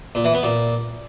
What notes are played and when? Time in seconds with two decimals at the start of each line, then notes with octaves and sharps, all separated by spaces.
0.15 A#2
0.24 E3
0.34 B3
0.43 A#2